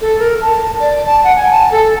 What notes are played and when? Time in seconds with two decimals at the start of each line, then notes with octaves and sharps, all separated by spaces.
0.01 A4
0.19 A#4
0.41 A5
0.79 D5
1.06 A5
1.24 F#5
1.36 G#5
1.51 A5
1.72 A4